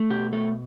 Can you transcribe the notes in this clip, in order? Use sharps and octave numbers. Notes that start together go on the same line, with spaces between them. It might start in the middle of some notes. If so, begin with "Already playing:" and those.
Already playing: A3
B2 G4
A3 A4